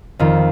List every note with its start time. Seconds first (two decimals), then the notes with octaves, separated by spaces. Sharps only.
0.19 F2 D#3 F4